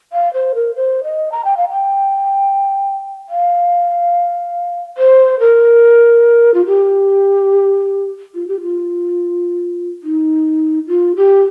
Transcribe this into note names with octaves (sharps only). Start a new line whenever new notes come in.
F5
C5
A#4
C5
D#5
A#5
G5
F5
G5
F5
C5
A#4
F4
G4
F4
G4
F4
D#4
F4
G4